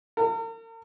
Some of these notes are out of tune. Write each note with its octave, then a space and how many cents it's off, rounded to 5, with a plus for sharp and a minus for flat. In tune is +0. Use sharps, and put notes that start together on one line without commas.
A#4 -45